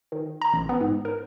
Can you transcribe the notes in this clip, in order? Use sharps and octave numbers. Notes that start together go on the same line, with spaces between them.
D#3
A#5
A1
B3
G#2
A#4